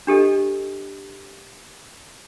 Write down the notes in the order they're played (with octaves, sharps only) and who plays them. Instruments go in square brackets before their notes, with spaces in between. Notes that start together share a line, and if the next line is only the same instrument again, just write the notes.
[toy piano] D4 G4 A4 D#5